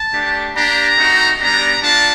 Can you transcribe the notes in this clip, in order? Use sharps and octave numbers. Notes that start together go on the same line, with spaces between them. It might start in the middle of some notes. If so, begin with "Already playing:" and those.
Already playing: A5
A3 D4 G4
A#3 D4 G4 A#5
A3 C4 D#4 F#4
G3 B3 D4 G4 A#5
A3 D4 F4 A5